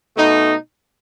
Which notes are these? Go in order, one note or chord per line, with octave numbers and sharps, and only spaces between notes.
B2 A3 D#4